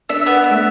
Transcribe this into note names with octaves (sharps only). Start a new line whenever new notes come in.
D4 E5
B3
E5
A3